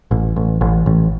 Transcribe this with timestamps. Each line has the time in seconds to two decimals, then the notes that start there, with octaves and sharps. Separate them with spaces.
0.11 A1
0.36 A1
0.61 A1
0.86 A1